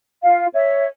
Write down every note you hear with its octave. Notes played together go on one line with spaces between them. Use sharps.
F4 F5
C#5 E5